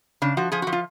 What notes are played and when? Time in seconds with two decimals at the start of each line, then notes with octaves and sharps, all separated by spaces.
0.22 C#3 D4
0.37 F3 F#4
0.52 F3 G#4
0.62 F#4
0.67 F3
0.72 F4